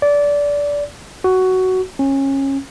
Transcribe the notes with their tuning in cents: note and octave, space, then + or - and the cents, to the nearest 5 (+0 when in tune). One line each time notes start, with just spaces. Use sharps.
D5 -20
F#4 +10
C#4 -25